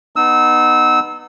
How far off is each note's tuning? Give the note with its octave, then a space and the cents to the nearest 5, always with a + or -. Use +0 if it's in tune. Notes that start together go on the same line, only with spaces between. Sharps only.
B3 +0 D#4 -25 E6 -20